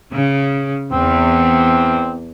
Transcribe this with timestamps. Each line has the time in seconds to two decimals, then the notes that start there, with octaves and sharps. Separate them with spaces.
0.12 C#3
0.92 E2 C4